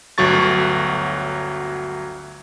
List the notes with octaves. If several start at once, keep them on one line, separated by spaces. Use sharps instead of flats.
G1 D2 F#3 C#6 A6